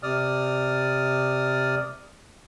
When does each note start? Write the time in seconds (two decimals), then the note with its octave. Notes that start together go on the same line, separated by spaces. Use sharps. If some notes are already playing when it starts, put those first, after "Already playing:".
0.03 C3 D5 D#6 F6